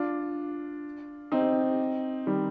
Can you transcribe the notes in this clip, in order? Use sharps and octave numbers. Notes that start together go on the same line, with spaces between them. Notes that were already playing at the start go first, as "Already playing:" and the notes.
Already playing: D4 F4
C4 D#4
D#3 G3